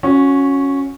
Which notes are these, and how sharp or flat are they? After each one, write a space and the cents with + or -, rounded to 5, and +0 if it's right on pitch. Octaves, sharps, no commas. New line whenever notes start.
C#4 -5 F#4 -25